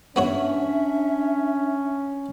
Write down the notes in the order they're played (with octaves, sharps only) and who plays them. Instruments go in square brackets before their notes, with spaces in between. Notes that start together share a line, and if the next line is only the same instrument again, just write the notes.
[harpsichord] B3 F#4 C#5 [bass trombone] C#4 [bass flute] D4 [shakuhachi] E5